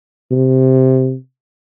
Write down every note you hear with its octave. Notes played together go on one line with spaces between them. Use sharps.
C3